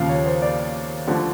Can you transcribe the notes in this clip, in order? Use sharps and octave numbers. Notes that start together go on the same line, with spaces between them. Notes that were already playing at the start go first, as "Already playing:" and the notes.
Already playing: D#2 C#3 F3 F5
C#5
C5
D5
D2 D3 F3